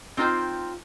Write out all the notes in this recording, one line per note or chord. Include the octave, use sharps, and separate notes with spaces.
C4 D#4 F4 C5 G5